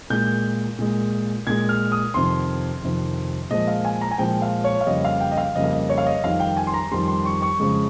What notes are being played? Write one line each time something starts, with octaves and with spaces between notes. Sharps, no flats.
A#2 G#3 G6
A#2 G#3
A#2 G#3 G#6
F6
D#6
F2 C3 D#3 C6
F2 C3 D#3
A#2 F3 G#3 D#5
F5
G#5
A#5
G#5
A#2 F3 G#3 G5
F5
C#5
F5
F2 C#3 G3 A#3 D#5
F5
G5
D#5
F5
F2 C#3 G3 A#3 D#5
F5
D#5
C#5
F5
D#5
F2 D#3 G3 F5
G5
G#5
C6
A#5
F2 D#3 G3 C6
C6
C#6
C#6
F2 C#3 G#3